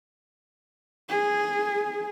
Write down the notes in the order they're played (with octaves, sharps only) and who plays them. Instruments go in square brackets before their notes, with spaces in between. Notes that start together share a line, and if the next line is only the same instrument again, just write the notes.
[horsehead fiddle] G#4